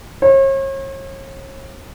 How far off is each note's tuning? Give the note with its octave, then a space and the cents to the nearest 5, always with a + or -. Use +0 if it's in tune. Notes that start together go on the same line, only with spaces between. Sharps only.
C#5 -40